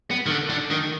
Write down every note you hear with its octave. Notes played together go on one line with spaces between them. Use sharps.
B3
D#3
D3
D3
D#3